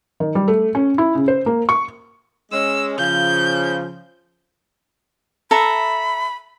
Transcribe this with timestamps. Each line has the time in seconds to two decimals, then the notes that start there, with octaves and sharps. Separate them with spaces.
0.20 D#3
0.35 G3
0.48 A3
0.75 C#4
0.98 E4
1.15 C#3
1.28 C5
1.46 A#3
1.69 C#6
2.52 G#3 C#4 E6
2.98 C#3 F3 G6
5.51 A4 E5 A#5 B5